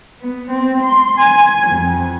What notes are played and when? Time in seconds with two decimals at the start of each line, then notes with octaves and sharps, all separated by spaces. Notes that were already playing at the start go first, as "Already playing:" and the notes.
0.20 B3
0.49 C4
0.83 C6
1.18 G#5
1.67 F2